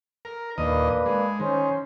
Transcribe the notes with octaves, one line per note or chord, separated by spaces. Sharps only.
A#4
D#2 A#2 A#3 D4 B4 D#5
G#3
D#3 C#4 C5